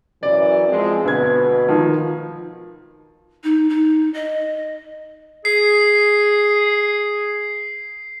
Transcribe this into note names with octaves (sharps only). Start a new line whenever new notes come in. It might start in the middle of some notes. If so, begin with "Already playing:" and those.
F#2 E3 D5
F3 G#3 C4
D2 B2 B4 G#6
D#3 F3
D#4
D#4
D#5
G#4 C7